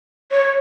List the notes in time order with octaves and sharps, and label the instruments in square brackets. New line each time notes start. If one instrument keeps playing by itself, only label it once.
[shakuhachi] C#5